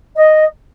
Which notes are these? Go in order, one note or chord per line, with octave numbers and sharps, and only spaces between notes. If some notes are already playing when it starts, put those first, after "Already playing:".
D#5